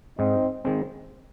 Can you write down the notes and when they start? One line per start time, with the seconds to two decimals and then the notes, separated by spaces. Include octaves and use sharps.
0.19 G#2 C4 D#4
0.65 D#3 G#3 C4